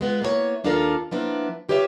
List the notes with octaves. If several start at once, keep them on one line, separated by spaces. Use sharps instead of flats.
G#3 B3 F4
A#3 B3 E4 G#4 C#5
D#2 D4 F4 A4 A#4 F5
F3 A#3 B3 D4 E4
F4 G4 B4 C#5 D#5 E5